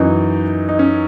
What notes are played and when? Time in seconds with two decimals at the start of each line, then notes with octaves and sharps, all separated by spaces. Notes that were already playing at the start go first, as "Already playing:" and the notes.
Already playing: F#2 E3 D#4
0.69 D#4
0.79 C#4